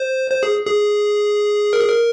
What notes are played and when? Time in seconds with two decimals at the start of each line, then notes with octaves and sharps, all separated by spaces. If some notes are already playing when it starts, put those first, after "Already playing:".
Already playing: C5
0.30 C5
0.43 G#4
0.66 G#4
1.73 A#4
1.81 G#4
1.89 A#4